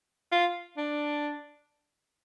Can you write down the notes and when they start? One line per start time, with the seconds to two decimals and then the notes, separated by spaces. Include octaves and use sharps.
0.32 F4
0.77 D4